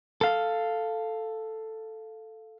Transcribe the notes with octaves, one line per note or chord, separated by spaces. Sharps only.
A4 F5